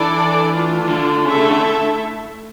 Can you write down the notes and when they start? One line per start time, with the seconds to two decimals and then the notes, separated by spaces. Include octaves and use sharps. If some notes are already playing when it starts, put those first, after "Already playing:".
Already playing: E3 D4 A4 D5
0.52 A3 D4 F4
0.89 D3
1.25 C#3 A3 E4 A4 E5
1.38 C#3
1.50 D3